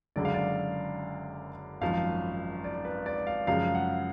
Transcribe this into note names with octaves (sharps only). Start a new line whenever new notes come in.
F#1 F#2 D3 G#3 D5
F5
D5
G#1 F#2 F3 F5
D5
B4
D5
F5
F#2 C#3 F3 G#3 F5
F#5